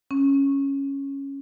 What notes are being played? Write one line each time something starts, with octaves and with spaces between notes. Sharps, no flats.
C#4